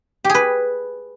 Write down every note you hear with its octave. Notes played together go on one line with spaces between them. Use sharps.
G4
G#4
B4